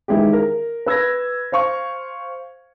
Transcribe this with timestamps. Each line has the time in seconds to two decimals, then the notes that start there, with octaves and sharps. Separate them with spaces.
0.08 D#3 E3 G#3 E4 G4
0.33 A#4
0.86 B4 E6 G#6 A#6
1.52 C5 F5 C#6